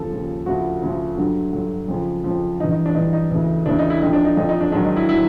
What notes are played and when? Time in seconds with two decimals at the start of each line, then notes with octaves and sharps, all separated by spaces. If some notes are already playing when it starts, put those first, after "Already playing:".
Already playing: D#2 C#3 F3 A4
0.11 D#2 C#3 F3
0.46 D2 C#3 F3 F#4
0.82 D2 C#3 F3
1.17 G2 D3 F#3
1.53 G2 D3 F#3
1.88 F2 C#3 F3
2.24 F2 C#3 F3
2.59 G2 D#4
2.63 E3
2.71 D#4
2.86 D4
2.95 G2 E3 D#4
3.13 D#4
3.31 D2 C#3 E3
3.66 D2 C#3 E3 D4
3.79 D#4
3.90 E4
4.02 F2 D3 F3 D#4
4.13 D4
4.25 D#4
4.37 F2 D3 F3 D#4
4.49 D#4
4.61 D4
4.72 G#2 D#3 F#3 D4
4.85 D#4
4.96 E4
5.09 D#3 F#3 E4